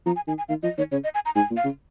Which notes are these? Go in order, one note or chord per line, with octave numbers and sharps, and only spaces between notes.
F3 A#5
G#5
D#3 G#5
G#5
D#3 F5
F3 D#5
D#3 C#5
C#3 C#5
D#5
G#5
A#5
G#2 G#5
A#2
F5
C#3